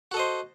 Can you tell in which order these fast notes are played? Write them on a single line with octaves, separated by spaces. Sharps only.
F#4 A4 D#5 C5